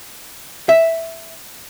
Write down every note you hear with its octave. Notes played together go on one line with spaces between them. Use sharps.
E5